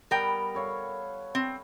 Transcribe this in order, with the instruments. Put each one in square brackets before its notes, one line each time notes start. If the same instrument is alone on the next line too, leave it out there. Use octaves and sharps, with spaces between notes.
[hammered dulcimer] G3 B3 [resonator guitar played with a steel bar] A#4 G5
[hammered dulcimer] A4 C#5 F5
[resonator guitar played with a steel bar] C4